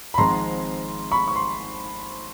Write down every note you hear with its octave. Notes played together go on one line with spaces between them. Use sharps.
B5
G#1 G#2 F3 G#3 C4 A#5 C6
B5 C#6
C#6
C6